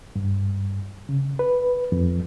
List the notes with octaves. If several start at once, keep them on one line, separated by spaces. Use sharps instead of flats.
G2
C#3
B4
F2